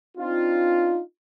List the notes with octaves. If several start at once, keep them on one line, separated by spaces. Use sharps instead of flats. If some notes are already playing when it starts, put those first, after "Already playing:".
C4 D4 D#4 F4